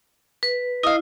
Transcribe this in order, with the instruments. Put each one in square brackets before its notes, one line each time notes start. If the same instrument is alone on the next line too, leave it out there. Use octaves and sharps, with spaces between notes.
[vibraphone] B4
[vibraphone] E4 [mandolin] D#5 F5